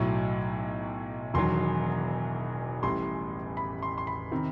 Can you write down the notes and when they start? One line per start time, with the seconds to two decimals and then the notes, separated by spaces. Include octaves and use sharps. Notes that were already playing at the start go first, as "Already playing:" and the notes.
Already playing: B1 A2 F#3
1.34 E1 E2 D#3 F#3 C6
2.83 A1 A2 G3 C6
3.57 B5
3.83 C6
3.98 C6
4.07 B5
4.31 C3 D#3